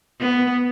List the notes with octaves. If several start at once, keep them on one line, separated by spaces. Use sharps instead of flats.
B3